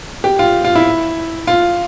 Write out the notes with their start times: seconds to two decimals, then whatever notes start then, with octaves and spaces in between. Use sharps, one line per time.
0.24 G4
0.39 F4
0.64 F4
0.75 E4
1.47 F4